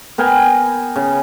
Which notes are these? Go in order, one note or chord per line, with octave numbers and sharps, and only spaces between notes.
B3 A#4 G5 G#5
C#3